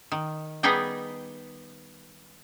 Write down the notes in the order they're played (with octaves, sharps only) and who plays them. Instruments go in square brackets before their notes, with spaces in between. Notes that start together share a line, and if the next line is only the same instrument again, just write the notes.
[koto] D#3
G3 B3 D#4 G#4 D#5 G5